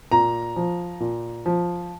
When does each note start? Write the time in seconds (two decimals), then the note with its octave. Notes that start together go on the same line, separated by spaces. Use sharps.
0.12 A#2 A#5
0.56 F3
1.00 A#2
1.46 F3